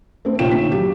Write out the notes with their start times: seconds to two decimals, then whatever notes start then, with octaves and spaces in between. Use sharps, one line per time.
0.25 A3 C4
0.39 A#1 C3 F4 C#5 G5 E7
0.51 D3 B6
0.72 F#3 G4